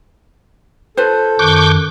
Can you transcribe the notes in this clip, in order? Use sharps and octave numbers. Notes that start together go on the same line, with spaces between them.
F4 A4 B4 C5
F#2 D#3 C#6 D6 F#6 G6